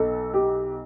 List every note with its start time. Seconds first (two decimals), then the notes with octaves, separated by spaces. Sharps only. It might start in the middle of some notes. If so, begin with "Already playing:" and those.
Already playing: B1 A4
0.33 G4